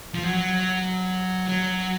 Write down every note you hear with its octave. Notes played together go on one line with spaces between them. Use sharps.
F3
F#3
F#3